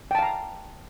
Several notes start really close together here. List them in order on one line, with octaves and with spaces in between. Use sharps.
G5 A5 F5 A#5